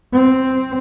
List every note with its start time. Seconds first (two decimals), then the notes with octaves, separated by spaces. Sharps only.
0.13 C4